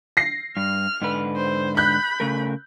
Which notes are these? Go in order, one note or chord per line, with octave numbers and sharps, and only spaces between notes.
A#6 C7
G2 F6
G#2 D3 B4
C5
B5 F#6 G6
C#3 A3 A#4